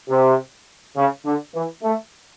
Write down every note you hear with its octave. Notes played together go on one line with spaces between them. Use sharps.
C3
C#3
D3
E3
A3